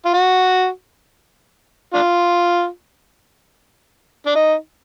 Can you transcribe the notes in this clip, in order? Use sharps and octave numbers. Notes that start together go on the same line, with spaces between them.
F4
F#4
D4 F4
D4
D#4